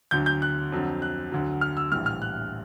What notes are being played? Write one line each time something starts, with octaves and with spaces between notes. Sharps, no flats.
D2 D3 F#3 G6
G6
F#6
F2 D3 F#3
F#6
D2 D3 F#3
F6
E6
A#1 A2 E3 G3 F6
F6
F#6